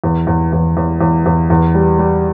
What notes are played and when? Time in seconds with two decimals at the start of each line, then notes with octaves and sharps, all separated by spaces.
0.04 E2
0.27 E2
0.53 E2
0.77 E2
1.01 E2
1.26 E2
1.50 E2
1.75 G3
1.99 G3